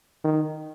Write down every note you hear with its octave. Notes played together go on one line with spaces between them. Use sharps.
D#3